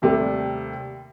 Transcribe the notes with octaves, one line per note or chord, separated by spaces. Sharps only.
D#2 C3 G3 A3